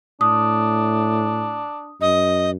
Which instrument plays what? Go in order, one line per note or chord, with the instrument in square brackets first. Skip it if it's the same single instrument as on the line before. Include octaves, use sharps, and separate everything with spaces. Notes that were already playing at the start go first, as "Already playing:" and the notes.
[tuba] A2 [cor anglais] D4 [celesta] D#6
[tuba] F#2 [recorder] D#5